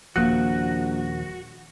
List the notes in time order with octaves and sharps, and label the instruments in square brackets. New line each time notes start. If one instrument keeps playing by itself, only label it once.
[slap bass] D#1 F3 [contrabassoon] A#1 [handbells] A#3 F#6 C#7 [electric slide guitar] F#4